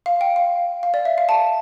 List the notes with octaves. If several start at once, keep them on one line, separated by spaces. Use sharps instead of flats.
F5
G5
F5
F5
D5
E5
F5
A5